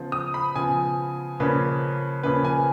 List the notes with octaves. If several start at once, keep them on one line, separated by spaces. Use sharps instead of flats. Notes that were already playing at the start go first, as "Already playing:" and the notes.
Already playing: C#3 F3 B3
D#6
B5
C#3 F3 B3 G#5
C#3 F3 A#3 C#4 B4
C#3 F3 A#3 C#4 B4
G#5